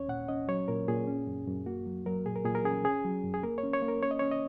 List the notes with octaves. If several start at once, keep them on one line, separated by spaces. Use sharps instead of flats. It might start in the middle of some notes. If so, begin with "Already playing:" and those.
Already playing: D#2 C#4 C#5
A#2 F#5
C#4 D#5
F#3 C#5
A#2 A#4
A#2 G#4
C#4
F#2
F#2
A#3 F#4
F#3
F#3 A#4
A#2 G#4
A#4
A#2 G#4
A#4
C#4 G#4
C#4 G#4
F#3
F#2
G#4
A#3 A#4
C#5
C#4
C#5
A#3
A#4
C#4 C#5
D#5
C#4 C#5
D#5